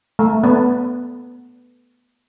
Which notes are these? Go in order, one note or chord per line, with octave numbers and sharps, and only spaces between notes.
A3
B3